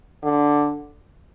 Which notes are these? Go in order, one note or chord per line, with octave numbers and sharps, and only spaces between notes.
D3